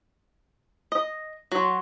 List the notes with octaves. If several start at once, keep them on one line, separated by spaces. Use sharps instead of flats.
D#5
F#3 F#4 C6